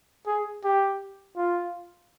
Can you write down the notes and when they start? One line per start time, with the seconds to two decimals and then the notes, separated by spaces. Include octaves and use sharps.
0.27 G#4
0.64 G4
1.37 F4